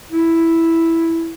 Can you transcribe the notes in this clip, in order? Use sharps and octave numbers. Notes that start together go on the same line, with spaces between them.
E4